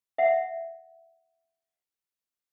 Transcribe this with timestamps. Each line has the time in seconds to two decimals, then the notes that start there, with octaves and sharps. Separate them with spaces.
0.18 E5 F#5